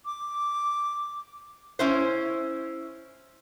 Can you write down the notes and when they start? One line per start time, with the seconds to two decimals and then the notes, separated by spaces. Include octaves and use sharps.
0.05 D6
1.79 C#4 E4 C5